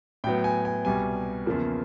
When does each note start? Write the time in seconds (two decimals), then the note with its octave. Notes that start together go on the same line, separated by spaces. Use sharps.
0.24 A2 F#3 B3 G5
0.44 G#5
0.65 G#5
0.85 C2 B2 G3 B3 G#5
1.46 E2 C#3 F3 A#3